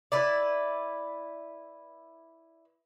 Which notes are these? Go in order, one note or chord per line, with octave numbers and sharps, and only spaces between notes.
E4 B4 D5